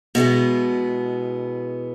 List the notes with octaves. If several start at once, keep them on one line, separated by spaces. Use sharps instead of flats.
B2 G#3 B3 E4